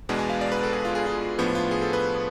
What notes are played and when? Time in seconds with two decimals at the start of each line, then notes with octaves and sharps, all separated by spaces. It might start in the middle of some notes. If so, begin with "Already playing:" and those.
0.09 E2 B2 G#3 B3 D4
0.19 G#5
0.30 F5
0.41 D5
0.52 B4
0.63 A4
0.73 G#4
0.85 F4
0.95 G#4
1.06 F4
1.39 A2 F3 B3 D4
1.55 F4
1.71 G#4
1.82 A4
1.93 B4